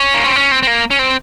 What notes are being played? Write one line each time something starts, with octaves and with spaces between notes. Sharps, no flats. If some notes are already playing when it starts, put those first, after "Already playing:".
Already playing: C#4
A#3
C4
C#4
C4
C4
A#3
C#4
C4